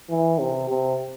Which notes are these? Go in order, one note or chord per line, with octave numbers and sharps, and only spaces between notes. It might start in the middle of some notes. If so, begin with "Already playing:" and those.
E3
C3
C3